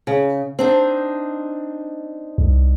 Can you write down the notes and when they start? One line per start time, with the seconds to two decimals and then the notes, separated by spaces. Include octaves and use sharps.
0.07 C#3
0.59 C4 D4 D#4
2.38 C2